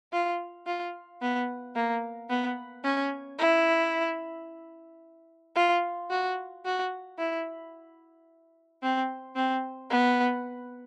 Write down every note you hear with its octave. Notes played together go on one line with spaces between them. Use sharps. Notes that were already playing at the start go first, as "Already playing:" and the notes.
F4
F4
B3
A#3
B3
C#4
E4
F4
F#4
F#4
E4
C4
C4
B3